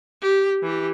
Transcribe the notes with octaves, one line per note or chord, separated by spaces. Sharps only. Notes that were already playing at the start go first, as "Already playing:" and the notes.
G4
E3 G4